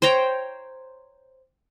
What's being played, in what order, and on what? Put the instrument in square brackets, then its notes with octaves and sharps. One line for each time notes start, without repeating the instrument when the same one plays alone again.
[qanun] C5 C#5 G5 A#5